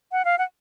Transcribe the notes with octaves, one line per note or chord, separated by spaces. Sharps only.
F#5
F5
F#5